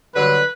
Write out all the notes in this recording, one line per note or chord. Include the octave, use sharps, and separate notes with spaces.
G2 D3 F#3 B4